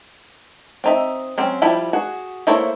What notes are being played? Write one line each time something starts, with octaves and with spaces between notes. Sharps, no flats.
C4 D#4 E5
F#3 C4 C#4
F3 G3 E4 G5 B5
F#4 G#4
A3 A#3 E4 C5 C#5